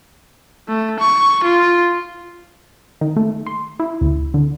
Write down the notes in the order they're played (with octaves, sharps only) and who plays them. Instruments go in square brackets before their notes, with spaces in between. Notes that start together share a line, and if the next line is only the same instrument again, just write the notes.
[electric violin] A3
C#6
F4
[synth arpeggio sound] D#3
A3
C6
E4
D2
D3